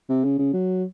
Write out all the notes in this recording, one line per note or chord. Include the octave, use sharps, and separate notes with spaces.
C3
C#3
C#3
F#3